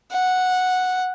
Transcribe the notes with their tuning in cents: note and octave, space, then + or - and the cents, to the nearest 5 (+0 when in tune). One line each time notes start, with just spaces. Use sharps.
F#5 -5